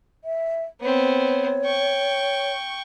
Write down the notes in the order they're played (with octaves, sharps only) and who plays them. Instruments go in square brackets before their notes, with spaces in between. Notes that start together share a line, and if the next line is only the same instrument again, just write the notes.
[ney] E5
[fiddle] B3 C4 [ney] C#5
[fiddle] G5 C#6